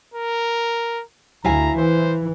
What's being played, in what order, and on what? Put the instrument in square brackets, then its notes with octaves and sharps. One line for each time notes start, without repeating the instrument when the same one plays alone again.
[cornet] A#4
[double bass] D2 [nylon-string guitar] E4 F5 G#5 [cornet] A#5
[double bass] E3 [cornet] C5